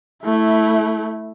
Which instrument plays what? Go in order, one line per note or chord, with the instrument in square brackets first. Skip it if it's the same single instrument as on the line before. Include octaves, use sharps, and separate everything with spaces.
[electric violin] A3 E4